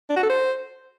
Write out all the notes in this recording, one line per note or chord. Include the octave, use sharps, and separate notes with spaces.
D4
F#4
A4
C5